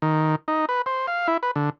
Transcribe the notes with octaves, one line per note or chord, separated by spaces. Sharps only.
D#3
D#4
B4
C5
F5
E4
B4
D3